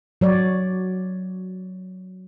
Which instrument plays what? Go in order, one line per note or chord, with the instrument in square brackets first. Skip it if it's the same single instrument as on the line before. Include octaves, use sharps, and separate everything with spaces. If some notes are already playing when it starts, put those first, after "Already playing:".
[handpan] F#3 C#5 D5